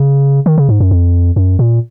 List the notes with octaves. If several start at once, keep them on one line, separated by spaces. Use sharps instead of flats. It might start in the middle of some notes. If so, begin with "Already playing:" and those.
Already playing: C#3
D#3
C#3
G#2
F#2
F2
F#2
A#2